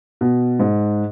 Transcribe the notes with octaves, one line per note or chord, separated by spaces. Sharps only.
B2
G#2